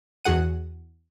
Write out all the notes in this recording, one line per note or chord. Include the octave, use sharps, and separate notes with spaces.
E2 F#4 G#4 F#5 D#7